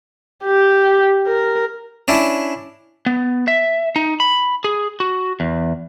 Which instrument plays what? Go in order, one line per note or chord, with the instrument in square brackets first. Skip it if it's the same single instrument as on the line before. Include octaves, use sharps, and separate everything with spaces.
[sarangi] G4
A#4
[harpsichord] C#4 D4 E4
[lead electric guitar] B3
E5
D#4
B5
G#4
F#4
E2